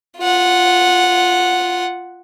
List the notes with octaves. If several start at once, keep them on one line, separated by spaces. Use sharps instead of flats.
F4 F#5